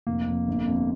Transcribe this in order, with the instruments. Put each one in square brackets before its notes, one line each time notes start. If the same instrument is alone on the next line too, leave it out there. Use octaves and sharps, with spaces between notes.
[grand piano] F1 [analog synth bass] A#3
[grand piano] F2
G1
F2